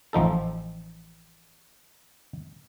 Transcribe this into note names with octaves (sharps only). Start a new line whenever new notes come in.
A1 F3 D#4 A4